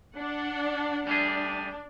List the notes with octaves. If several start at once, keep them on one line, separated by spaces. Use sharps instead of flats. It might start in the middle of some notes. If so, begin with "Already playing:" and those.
D4 F#5
G3 A3 D4 G#4